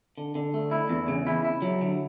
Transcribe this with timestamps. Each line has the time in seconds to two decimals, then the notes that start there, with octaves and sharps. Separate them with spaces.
0.18 D3
0.35 D3
0.54 A3
0.71 E4
0.89 E2
1.08 C#3
1.27 E4
1.44 E4
1.62 F#3
1.81 D3